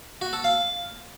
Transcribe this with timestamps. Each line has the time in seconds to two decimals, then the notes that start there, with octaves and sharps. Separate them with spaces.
0.21 F#4
0.33 A4
0.44 F5